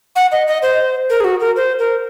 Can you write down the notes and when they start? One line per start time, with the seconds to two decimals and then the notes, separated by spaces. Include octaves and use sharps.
0.16 F#5
0.32 D#5
0.47 D#5
0.62 C5
1.10 A#4
1.20 G#4
1.24 F#4
1.40 A#4
1.56 C5
1.79 A#4